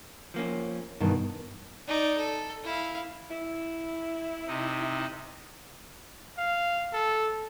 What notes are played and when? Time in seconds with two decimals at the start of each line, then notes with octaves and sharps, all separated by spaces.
0.34 F3 A#3 C#4
1.00 G2 B2 D#3 E3
1.88 D#4 D5
2.18 A4
2.64 E4 F5
3.30 E4
4.47 C3 D#4
6.38 F5
6.93 A4